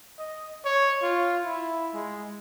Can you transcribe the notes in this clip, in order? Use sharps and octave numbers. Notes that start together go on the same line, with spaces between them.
D#5
C#5
F4
E4
G#3